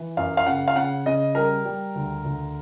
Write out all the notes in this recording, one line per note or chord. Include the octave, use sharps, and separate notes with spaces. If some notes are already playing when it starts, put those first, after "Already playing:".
Already playing: E3
F#2 F5
F5
C#3 F#5
F5
C#3 F#5
C#3 D#5
G3 A#4
G3
D2
D2